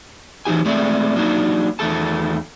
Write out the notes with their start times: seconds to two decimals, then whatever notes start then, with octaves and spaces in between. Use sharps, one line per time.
0.45 E3 F#3 D#4 G4 G#5
0.65 G#3 A3 C4 A4 D5 E5
1.16 F#3 A#3 D4 D#4
1.79 E2 D#3 A3 A4 A5